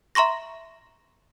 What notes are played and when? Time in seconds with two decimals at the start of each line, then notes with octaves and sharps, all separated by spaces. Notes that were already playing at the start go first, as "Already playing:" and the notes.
0.15 E5 A#5 C6 C#6 A#6